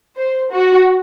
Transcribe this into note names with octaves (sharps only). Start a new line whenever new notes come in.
C5
F#4